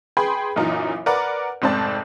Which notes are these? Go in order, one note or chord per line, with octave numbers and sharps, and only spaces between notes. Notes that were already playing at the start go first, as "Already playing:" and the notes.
G#4 B4 G5 B5 C6
F#2 A#2 E3 D#4
A#4 B4 D5 F#5 D6
F1 G#2 C4 D5 A5